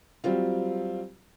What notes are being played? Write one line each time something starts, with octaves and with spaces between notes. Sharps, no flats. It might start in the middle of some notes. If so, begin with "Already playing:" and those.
F#3 G3 C4 F4